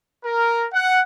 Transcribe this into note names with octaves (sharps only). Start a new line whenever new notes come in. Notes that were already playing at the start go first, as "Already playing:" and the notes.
A#4
F#5